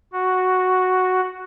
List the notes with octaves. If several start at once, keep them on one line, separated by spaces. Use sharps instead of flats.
F#4